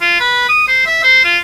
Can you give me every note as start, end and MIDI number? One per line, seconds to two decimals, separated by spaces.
0.01 0.19 65
0.20 0.45 71
0.49 0.66 87
0.68 0.85 72
0.86 1.03 76
1.03 1.24 72
1.24 1.38 65